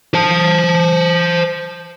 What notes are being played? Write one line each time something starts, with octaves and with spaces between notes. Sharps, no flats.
C5 A5